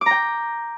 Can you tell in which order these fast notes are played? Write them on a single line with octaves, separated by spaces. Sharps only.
D6 A#5 G5